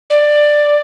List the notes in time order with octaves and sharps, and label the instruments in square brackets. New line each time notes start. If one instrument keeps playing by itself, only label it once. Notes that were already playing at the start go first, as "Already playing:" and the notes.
[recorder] D5